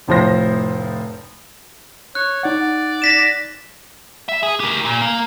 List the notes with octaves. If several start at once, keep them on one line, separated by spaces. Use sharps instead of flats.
F1 A2 F3 C5 A#6
C#5 F#6
D#4 D5 F#5
A#6 B6 E7
E5
G#4
G4 A#4
A#2
A#3